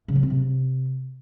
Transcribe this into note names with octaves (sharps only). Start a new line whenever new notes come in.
C#3
F#3
C4
C3